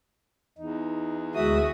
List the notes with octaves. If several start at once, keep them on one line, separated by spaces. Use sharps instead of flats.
E2 D#4
D2 G#3 F#4 E5 D#6